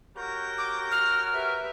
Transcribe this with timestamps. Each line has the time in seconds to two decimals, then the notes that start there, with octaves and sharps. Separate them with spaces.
0.17 F#4 G4 A#4 C#5 G6 A#6
0.58 D6
0.91 F6
1.32 G4 B4 E5